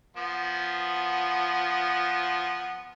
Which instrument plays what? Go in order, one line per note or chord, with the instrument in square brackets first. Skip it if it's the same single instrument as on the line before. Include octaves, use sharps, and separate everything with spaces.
[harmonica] F3 B3